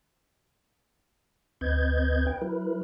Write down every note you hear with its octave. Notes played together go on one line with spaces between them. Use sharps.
D2 C4 B4 D#5 G6 G#6
B4 G5
F#3 E4 A#4 B4